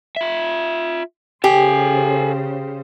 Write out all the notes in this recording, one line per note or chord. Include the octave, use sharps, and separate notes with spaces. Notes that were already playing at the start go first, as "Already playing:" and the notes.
F4 E5
C#3 G4 A4 C5 G#5